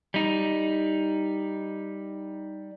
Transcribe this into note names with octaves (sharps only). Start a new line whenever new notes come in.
G3 D#4